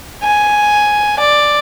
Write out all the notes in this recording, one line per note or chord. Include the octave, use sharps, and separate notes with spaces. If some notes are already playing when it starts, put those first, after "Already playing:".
G#5
D5